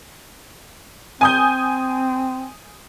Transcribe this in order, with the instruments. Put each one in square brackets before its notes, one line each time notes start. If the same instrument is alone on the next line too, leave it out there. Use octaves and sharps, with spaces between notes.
[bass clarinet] C4 [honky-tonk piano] G#5 D#6 G6